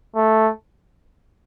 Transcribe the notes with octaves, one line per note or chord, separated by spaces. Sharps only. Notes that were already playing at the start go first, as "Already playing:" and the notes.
A3